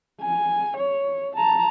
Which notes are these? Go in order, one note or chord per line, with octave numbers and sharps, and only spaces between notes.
G#5
C#5
A5 A#5